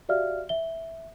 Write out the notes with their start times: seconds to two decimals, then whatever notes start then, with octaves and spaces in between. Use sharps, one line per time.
0.09 F#4 G4 D5 E5 F5 F6
0.49 E5 G7